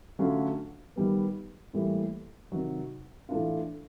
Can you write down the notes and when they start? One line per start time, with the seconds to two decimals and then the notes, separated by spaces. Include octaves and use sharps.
0.19 D3 F#3 A3 C#4 F4
0.96 D#3 G3 B3
1.73 A2 E3 G3 A#3
2.52 C3 D#3 F#3
3.29 A2 E3 A3 D4 F4